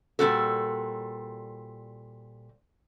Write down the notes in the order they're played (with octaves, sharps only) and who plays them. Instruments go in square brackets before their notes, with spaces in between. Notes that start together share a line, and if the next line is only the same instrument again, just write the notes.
[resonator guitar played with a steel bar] A#2 G3 C4 F#4 A4